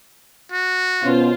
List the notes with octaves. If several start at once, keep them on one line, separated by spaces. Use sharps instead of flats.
F#4
B2 B3 C#4 F4 C5